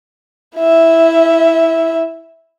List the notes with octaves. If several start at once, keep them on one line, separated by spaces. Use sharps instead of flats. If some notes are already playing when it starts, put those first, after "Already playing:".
E4 E5